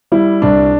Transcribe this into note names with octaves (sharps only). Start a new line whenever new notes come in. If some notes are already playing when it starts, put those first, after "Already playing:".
G3 E4
C2 D4